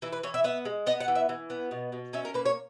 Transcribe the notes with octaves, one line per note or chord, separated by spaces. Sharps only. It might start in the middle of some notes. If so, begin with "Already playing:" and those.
E3 E4
B4
E3 C#5
E5
B3 E5
G#3
B3 D#5
F#5
E3
E5
E3
B3
B2
B2
C#4 E5
A#4
A#3 B4
C#5